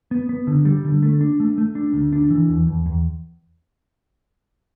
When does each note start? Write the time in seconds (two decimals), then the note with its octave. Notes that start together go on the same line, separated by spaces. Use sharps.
0.11 B3
0.29 B3
0.47 D3
0.65 G3
0.85 D3
1.03 A3
1.21 D4
1.40 A3
1.58 A3
1.75 D4
1.94 D2
2.13 D4
2.30 E3
2.49 E2
2.67 E2
2.86 E2